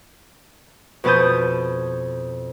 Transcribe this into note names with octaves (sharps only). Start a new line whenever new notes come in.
F2 B2 B4 A5 D#6 G6